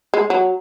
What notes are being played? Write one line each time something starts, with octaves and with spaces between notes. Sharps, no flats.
G#3
F#3